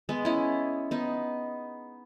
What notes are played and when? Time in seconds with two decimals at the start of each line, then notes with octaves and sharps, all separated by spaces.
0.09 G#3 B3
0.25 C#4 E4
0.91 B3 D#4